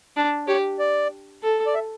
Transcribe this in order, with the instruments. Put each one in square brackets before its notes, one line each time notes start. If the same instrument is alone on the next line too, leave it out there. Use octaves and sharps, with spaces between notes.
[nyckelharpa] D4
[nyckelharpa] G4 [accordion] C#5
[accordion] D5
[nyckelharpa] A4
[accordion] D5
E5